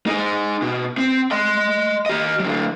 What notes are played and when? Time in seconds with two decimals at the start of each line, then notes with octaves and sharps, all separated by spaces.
0.07 D#4 G#4
0.62 B2
0.98 C4
1.31 D#5 C6
2.06 G4 D#5
2.40 D3 F#3